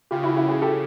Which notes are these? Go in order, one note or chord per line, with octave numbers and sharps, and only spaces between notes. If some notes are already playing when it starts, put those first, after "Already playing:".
C#3 F4 G4
E4 F#4
E4 F#4
F#4 G#4
G4 A4